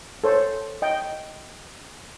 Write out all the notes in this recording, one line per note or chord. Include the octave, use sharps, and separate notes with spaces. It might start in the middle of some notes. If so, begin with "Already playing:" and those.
A4 C5 C#5
D#5 G5